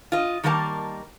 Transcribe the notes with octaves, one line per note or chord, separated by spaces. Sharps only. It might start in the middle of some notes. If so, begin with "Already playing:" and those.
F4 D#5
D#3 G3 A#3 A#4 F#5 A5